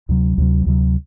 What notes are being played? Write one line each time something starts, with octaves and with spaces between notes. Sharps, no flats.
D2 C3 F#3
D2 C3 F#3
D2 C3 F#3